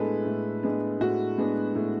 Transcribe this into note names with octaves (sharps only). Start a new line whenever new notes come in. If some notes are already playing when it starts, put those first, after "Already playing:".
Already playing: A2 G#3 B3 D4 A4 B4
A2
G#3 B3 D4
A2 F#4
G#3 B3 D4
A2